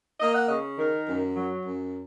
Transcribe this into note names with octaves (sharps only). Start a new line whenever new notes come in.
A#3 D#5
F#5
C#3 D#5
D#3 A#4
F#2
F#3
F#2